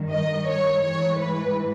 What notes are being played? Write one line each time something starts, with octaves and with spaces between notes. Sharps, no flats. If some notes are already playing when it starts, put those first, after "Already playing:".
Already playing: G2 D#3
D#5
C#5
G#2 E3 C#5
B4